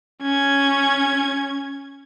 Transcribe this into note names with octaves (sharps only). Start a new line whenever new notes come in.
C#4 G#6